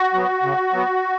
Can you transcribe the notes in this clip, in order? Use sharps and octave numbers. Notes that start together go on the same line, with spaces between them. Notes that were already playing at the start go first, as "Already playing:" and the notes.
Already playing: F#4
F#3 B3
C#3
F#3 B3